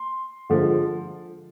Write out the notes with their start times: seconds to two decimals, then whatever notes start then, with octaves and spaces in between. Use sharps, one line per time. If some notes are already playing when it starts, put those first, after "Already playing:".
Already playing: C6
0.50 D3 F3 G#3